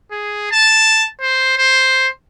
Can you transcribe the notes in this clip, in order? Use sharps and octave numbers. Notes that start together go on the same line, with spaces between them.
G#4
A5
C5
C5